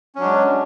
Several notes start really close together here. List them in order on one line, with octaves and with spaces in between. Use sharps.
C#4 F#3 D4 G#3